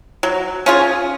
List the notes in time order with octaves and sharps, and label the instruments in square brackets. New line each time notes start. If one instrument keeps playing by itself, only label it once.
[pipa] F#3
C#4 F4 G#4